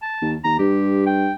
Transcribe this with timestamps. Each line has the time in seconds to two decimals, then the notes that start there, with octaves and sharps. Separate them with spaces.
0.02 A5
0.22 D#2
0.44 D#2 A#5
0.59 G2 G4
1.07 G5